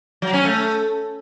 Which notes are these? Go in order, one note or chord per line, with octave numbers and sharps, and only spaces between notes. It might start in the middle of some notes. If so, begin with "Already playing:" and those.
F#3
C#4
A3